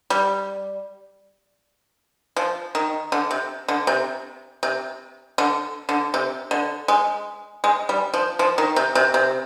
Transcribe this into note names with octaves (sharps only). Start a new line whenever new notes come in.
G3
F3
D#3
D3
C3
D3
C3
C3
D3
D3
C3
D3
G#3
G#3
G3
F3
F3
D#3
C3
C3
C3